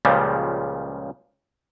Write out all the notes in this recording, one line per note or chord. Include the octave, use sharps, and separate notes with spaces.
C#2 A#2 C#3 F3 G3